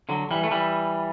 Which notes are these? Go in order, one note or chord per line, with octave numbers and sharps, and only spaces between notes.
D3 F#3
E3 G3
A3
E3 G3